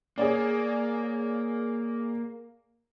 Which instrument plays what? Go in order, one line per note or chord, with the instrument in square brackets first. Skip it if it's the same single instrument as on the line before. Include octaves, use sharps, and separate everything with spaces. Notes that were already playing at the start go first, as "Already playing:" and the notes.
[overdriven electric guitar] A#3 [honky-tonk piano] G#4 C#5 D5